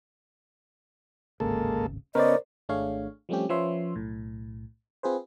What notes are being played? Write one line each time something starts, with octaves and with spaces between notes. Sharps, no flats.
D1 G#1 C#3 G#3 A#3 A4
C#3 B3 C#4 A#4 C5 D5 D#5
G#1 A3 D4 G#4 C#5 F5
F3 G3 A3 C4 C#4 G4
F3 C#4 B4 C#5 E5 C6
B1 A2
C4 F4 G#4 B4 C5